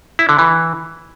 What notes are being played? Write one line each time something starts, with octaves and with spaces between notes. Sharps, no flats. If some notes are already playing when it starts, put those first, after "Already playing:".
E4
D3
E3